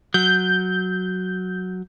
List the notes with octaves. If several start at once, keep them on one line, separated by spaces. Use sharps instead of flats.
F#3 G6